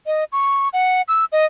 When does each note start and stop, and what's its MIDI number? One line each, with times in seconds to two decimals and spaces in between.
0.06 0.24 75
0.32 0.69 85
0.73 1.02 78
1.08 1.25 88
1.32 1.45 75